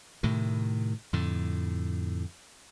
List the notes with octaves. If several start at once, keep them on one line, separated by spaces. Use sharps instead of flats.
A2 C3 D#3
F2 A2 D3